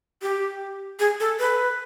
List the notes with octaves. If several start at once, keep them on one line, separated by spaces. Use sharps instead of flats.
G4
G#4
A4
B4